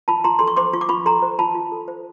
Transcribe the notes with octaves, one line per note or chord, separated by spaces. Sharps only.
F4 A5 B5
F4 A#5 C6
A4 C6
C#6
C5 C6 D6
F4 C#6
D6
F4 B5 C#6
A4 A#5 C6
C5
F4 A5 B5
F4
A4
C5